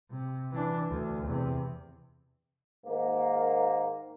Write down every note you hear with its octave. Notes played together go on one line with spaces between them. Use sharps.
C3
E3 D4
D2
E2 C3
G#2 D#3 A#3